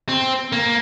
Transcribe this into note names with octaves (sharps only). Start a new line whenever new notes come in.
C4
A#3